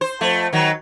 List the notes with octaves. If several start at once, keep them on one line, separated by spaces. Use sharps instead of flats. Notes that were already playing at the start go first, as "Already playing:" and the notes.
C5
F2 A3
D#3 F#3